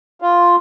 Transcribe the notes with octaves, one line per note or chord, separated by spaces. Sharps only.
F4